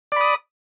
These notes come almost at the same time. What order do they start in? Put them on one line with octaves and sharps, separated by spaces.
D5 B5 D#6